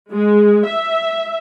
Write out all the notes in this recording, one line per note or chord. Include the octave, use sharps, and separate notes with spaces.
G#3
E5